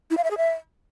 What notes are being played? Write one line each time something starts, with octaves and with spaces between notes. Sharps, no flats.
E4
F5
E5
G#4
E5